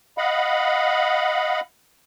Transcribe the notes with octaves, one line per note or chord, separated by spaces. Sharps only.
D#5 F5 F#5 B5